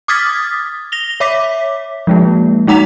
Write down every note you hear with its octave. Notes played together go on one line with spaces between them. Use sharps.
D6 D#6 F6 G#6 A6 B6
A#6 F7 G7
C#5 E5 D6 B6
F3 G#3 A#3
G#3 D#4 F#5 A#5 B6 F7